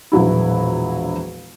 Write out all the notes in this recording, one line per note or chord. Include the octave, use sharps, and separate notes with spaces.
E1 A#1 F#3 E4